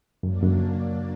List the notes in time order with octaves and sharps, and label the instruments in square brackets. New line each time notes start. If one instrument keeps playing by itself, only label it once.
[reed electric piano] F#2 [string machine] F#3 A#3 D4
[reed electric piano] F#2